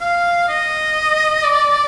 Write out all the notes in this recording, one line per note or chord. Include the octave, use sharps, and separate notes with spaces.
F5
D#5
D5